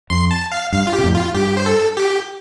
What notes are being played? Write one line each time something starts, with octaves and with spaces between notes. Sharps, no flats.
F2 C6
A5
F5
G2 F5
F4
G4
C3
F2 A2
F4
G2 G4
C5
A4
G4